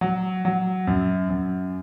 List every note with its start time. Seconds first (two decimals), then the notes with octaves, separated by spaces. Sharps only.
0.01 F#3
0.45 F#3
0.87 F#2
1.29 F#2